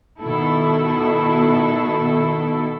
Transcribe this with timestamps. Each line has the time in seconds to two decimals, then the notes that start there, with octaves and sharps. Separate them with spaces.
0.19 B2 D#3 E4 A4